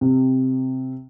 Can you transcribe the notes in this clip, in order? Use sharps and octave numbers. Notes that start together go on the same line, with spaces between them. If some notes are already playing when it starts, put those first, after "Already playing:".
C3